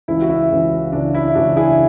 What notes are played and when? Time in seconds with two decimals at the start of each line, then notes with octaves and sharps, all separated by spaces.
0.08 C#2 C#3 E3 E4
0.22 F#4
0.29 E4
0.51 C#2 C#3 E3
0.92 C#2 C#3 E3 D4
1.14 E4
1.35 C#2 C#3 E3 D4 F#4
1.56 E4 G#4